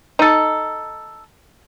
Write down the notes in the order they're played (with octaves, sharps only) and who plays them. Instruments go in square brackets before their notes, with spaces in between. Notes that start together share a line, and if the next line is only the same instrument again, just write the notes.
[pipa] D#4 A4